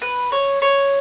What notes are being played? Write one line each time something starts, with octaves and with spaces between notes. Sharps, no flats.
B4
C#5
C#5